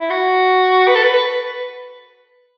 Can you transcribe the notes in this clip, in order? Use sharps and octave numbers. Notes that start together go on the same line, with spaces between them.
E4
F#4
B4
A4
B4
B4